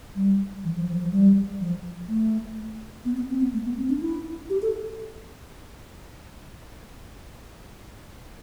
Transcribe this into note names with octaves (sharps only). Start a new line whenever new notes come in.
G3
E3
F3
F3
F3
G3
F3
A3
B3
B3
C4
B3
A3
B3
C4
D4
E4
G4
A4